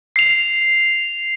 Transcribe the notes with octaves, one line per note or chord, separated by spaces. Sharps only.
C7 F7